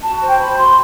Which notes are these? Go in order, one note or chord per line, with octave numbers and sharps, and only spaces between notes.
F#4 A5
A5
C5
G5
C5 B5
F#4 C6